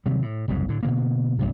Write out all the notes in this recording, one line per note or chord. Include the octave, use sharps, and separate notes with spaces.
C3 D#3 F#3 G3
A2
F#1 C2 F2 G#2
A2 D3
B2 D3 A#3
F1 E2 G2 C3